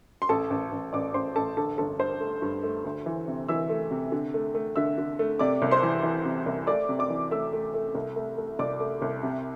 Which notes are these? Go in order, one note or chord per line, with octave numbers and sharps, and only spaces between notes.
C6
A1 A4 A5
A1
A1
A1 D5 D6
A1 C5 C6
A1 A4 A5
D3 A4 A5
G1 A4 A5
G2 C5 C6
A3
G2
A3
D2
E3
C3
E3 E5 E6
A3
C3
D3
A3
A3
D3 E5 E6
D3
A3
C3 D5 D6
C2
C5 C6
E3
E3
C3
C2
A3 D5 D6
C3
D5 D6
E3
A3 E5 E6
A3
A3
C2
A3
A3
C2 D5 D6
A3
C2
C3